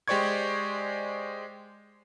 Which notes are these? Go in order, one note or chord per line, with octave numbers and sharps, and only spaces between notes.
G#3 G4 C5 D5 C#6 G#6